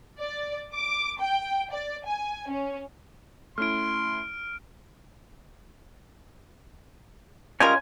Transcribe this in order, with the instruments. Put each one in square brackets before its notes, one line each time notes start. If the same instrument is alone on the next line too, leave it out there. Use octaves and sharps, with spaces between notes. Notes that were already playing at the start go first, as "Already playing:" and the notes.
[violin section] D5
D6
G5
D5
G#5
C#4
[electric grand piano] A3 C#4 E4 [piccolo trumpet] C6 [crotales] F6 D7
[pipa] G3 G#3 A#4 [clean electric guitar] C#4 F4 [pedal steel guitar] G#5